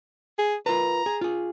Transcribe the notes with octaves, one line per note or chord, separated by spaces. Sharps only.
G#4
F4 A#4 B4 A#5
G#4
F4 G#4